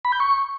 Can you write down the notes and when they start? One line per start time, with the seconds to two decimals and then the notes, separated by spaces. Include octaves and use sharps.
0.05 B5
0.12 G6
0.20 C#6